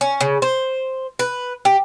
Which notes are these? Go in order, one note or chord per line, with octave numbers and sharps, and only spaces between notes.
C#4
C#3
C5
B4
G4